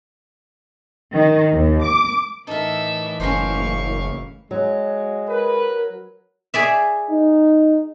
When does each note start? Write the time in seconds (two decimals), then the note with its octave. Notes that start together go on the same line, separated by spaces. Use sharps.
1.13 D#3
1.52 D#2
1.83 D6
2.47 A2 E3 D#4 A4 A#4 E5
3.20 F#1 C#4 A#4 C5 F5 C#6
4.51 F#3 G#3
5.28 A#4 B4
6.54 G#4 D5 E5
7.10 D#4